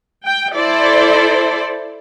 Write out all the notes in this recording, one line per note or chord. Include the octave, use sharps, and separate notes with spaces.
G5
E4 A4 C5 D5